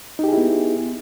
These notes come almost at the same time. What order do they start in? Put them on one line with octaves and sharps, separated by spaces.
D#4 G4 G#4 E4 B3